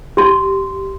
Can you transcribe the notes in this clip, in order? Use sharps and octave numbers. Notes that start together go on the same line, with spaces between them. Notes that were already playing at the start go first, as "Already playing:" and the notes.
G4 C6